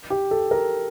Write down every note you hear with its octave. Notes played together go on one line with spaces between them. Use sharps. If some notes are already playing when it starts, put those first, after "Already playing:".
G4
A4
A#4